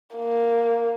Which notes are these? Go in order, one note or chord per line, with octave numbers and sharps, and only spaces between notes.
A#3